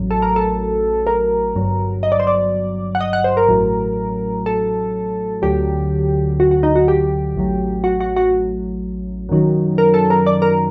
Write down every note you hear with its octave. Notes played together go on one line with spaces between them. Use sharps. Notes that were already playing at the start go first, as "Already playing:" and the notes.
Already playing: A1 A2 F#3
A4
A#4
A4
A#4
G1 G2 F#3
D#5
D5
C5
D5
F#5
D#5
F#5
C5
A#4
A1 A2 F#3
A4
D2 D3 F#3 G4
F#4
F#4
D#4
F#4
G4
A1 A2 F#3
F#4
F#4
F#4
F#2 D#3 F#3
A#4
A4
A#4
D5
A#4